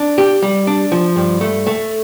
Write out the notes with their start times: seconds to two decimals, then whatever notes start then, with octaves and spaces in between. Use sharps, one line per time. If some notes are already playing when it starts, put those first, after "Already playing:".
Already playing: D4
0.18 G4
0.42 G3
0.67 D4
0.92 F3
1.16 G2
1.41 A3
1.67 A3